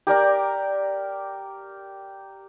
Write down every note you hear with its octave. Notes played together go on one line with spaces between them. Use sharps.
G4 A#4 D5 A#5